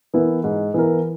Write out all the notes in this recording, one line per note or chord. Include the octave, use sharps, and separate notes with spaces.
E3 B3 E4 A#4
G#2
E3 B3 E4 A#4